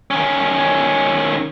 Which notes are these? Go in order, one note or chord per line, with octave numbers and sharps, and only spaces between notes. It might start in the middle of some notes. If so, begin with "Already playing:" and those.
D#3 C#4